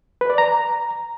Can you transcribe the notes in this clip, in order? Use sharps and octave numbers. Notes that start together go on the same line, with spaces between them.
B4
D5
A#5